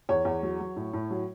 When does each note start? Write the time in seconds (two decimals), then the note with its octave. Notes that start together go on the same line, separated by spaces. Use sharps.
0.09 E2 C#5
0.25 E2
0.43 F#3
0.60 F#3
0.76 A2
0.93 A2
1.10 F#3